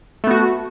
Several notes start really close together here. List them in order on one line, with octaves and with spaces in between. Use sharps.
A3 B3 F#4